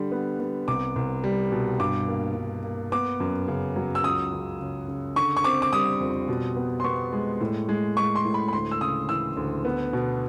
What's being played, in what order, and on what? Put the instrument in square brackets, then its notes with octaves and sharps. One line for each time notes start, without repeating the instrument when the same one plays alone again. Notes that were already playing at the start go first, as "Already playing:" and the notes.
Already playing: [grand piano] D3 G3
B3
B3
C2 D6
C2
G3
B2
G2 D6
A#3
G2
A#3
B3 D6
F#2
C#3
F#3
E6
C#2 D#6
C#3
C#3
C#3
D3 C#6
C#6
C4 D6
D6
G3 D#6
F2
B2
B3
C6
B3 C#6
G#3
A2
G#3
G#3 C#6
C6
A2
B5
B5
D2 C6
E6
C#3 D#6
E3 E6
D2
B3
B2